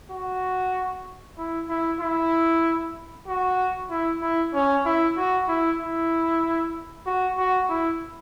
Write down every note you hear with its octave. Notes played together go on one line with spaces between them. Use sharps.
F#4
E4
E4
E4
F#4
E4
E4
C#4
E4
F#4
E4
E4
F#4
F#4
E4